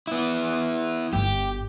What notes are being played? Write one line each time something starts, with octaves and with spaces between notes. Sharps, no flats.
B3 E4
G1 G4